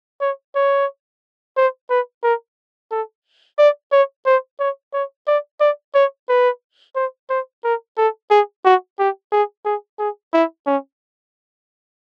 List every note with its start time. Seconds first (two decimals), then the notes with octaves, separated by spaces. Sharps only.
0.21 C#5
0.55 C#5
1.57 C5
1.90 B4
2.23 A#4
2.91 A4
3.59 D5
3.92 C#5
4.26 C5
4.60 C#5
4.94 C#5
5.27 D5
5.60 D5
5.95 C#5
6.29 B4
6.96 C5
7.30 C5
7.64 A#4
7.98 A4
8.31 G#4
8.65 F#4
8.99 G4
9.32 G#4
9.65 G#4
9.99 G#4
10.34 E4
10.67 C#4